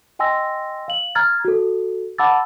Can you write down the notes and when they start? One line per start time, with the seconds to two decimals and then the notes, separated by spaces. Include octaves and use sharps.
0.19 D#5 G5 G#5 C6 E6 A#6
0.88 F5 F#7
1.15 A#5 F6 G#6 A6
1.45 F#4 A4
2.18 F#5 A5 B5 D6 E6 A6